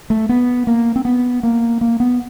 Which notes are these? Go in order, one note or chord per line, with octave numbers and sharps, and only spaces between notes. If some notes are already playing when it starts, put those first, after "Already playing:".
A3
B3
A#3
C4
B3
A#3
A#3
B3